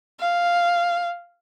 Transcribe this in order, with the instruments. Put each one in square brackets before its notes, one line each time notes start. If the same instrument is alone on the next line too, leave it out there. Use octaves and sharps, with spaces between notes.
[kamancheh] F5